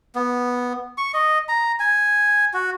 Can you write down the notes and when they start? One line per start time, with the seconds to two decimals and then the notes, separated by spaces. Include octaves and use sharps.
0.15 B3
0.98 C#6
1.14 D#5
1.49 A#5
1.80 G#5
2.54 F#4